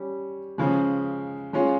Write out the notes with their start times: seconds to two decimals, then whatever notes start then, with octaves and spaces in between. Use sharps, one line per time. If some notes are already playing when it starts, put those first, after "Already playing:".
Already playing: G3 C#4
0.58 C#3 F3 G#3
1.53 G#3 C#4 F4